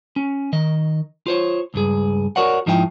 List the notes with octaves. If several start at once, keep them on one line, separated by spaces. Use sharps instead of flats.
C#4
D#3 D#5
F4 C5 C#5
C#2 G2 G#4
F#4 A#4 C#5 D5 F#5
G#2 F3 D#4 E4 E5 G5